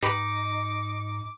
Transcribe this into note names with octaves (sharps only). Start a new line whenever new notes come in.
G#2 D#4 G4 B4 B5 D6